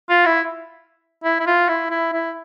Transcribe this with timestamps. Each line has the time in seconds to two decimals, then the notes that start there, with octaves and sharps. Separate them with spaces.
0.09 F4
0.26 E4
1.24 E4
1.40 E4
1.47 F4
1.69 E4
1.91 E4
2.13 E4